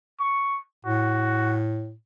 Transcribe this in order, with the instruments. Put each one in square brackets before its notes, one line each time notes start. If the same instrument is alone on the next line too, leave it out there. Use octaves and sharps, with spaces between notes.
[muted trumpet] C#6
[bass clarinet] A2 [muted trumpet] F#4